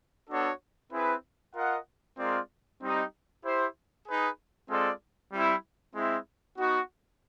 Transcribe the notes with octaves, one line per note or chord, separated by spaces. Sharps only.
B3 D4 F#4 A4 C#5
C4 E4 G#4 B4
F4 A#4 D#5 F#5
G#3 C4 F4 A#4 D5
G3 C4 D#4 G4
E4 G4 C5
D#4 G#4 B4
G#3 C4 F4 A4 D5
G3 C4 E4
G#3 C4 E4
B3 D#4 F#4